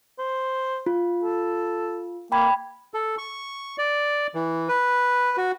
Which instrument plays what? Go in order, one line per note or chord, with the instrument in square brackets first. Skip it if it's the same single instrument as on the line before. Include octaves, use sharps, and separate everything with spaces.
[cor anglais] C5
[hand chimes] F4
[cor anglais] A4
[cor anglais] A#3 [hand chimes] G5 B5 G#6
[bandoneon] A4
C#6
D5
E3
B4
F#4